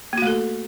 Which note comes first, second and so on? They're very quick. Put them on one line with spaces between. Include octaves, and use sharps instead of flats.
A#3 F#4 A3 A4